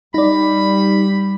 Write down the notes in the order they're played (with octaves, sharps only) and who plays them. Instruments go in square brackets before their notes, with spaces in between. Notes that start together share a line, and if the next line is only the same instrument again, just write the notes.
[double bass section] G3 [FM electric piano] D#4 D5 [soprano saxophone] B5